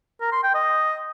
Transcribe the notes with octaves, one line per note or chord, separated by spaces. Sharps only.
A#4
C6
G5
D#5